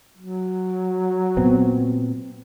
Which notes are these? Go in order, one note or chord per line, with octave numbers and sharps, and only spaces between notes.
F#3
A#2 B3 C4